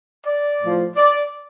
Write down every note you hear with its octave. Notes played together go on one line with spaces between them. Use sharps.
D5
A2 F3
D5